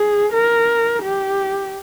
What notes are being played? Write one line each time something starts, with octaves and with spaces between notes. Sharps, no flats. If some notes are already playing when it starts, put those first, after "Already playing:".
Already playing: G#4
A#4
G4